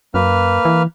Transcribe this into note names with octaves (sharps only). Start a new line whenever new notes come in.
F#2 A#3 B4 F6
E3